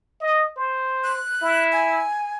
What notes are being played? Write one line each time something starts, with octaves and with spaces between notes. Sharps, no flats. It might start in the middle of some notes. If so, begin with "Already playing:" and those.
D#5
C5
F#6
E4
G#5